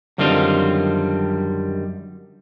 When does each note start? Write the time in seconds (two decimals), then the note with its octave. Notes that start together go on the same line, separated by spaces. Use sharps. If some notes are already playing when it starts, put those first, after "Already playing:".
0.18 F#2 D3 D#3 G3 C4 F4